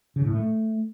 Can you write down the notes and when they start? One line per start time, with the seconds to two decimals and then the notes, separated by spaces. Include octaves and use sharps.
0.16 C#3
0.25 A2
0.33 A3